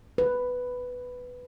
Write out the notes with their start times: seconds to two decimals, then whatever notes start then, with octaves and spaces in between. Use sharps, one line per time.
0.18 B4